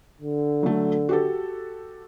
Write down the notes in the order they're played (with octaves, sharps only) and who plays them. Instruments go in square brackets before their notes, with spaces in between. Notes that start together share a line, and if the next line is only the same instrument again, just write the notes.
[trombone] D3
[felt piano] F#3 A3
F#4 G4 A4